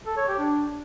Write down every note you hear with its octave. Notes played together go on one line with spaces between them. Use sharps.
A4
C#5
G4
D4